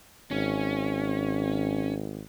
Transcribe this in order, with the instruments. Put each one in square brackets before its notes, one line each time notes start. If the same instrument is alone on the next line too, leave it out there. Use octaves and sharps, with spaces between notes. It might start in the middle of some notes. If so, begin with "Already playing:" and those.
[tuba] G#1 [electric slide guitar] C#4